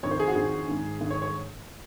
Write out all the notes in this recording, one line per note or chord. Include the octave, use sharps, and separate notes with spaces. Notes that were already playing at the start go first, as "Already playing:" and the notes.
F2 D#3 C#5
C5
G#4
F#4
F2 D#3 G#4
G#2 D#3
G#2 D#3
C#5
C#5